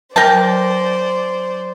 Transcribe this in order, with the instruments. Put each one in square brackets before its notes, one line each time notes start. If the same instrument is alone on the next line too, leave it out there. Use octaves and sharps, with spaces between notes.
[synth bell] F#3 [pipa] A#4 G5 A5 [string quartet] C5 D5